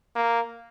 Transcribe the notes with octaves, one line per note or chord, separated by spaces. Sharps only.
A#3